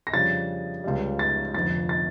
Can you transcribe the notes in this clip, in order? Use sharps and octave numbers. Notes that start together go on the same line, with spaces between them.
A#6
F2 C#3 G3 D4 A6
C#2 C#3 G3
A6
F1 F2 D3 A6
A6